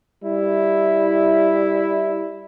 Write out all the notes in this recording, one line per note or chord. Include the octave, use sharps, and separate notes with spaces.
G3 E4